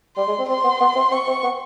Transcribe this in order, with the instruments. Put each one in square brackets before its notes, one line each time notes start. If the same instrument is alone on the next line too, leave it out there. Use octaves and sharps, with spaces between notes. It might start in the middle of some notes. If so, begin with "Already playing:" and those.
[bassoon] G3 [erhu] C6
[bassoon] G#3
C4
[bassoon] C4 [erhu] C6
[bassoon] B3
B3
C4
[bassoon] C4 [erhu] C#6
[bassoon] C4
B3